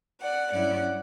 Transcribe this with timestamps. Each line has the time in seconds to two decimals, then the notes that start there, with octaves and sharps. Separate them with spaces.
0.21 D5 F#5
0.52 G2 F#3 C#4 E4 D5 F#5